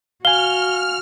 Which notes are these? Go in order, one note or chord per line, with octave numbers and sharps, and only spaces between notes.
F#4 F5 G#5 F6 G7